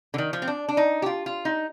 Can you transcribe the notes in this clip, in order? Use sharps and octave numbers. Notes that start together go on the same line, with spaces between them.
D3
D#3
F3
C4
D4
D4
D#4
G4
F4
F4
D#4